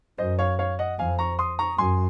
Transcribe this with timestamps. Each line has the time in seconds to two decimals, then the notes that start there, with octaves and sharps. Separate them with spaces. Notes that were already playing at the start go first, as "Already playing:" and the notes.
0.18 F#2 C5 D#5
0.39 C#5 F5
0.59 C#5 F5
0.79 D#5 F#5
0.99 F2 F5 G#5
1.19 A#5 C#6
1.39 C6 D#6
1.59 A#5 C#6
1.78 F#2 G#5 C6